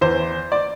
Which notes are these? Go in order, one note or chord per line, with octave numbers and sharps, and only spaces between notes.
E2 E3 C5
D5